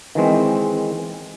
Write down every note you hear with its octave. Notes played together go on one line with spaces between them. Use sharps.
D#3 E3 G#3 C4